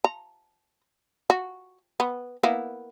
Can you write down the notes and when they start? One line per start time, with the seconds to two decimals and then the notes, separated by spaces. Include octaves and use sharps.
0.04 A#5
1.30 F#4
2.00 B3
2.43 A#3 B3 E4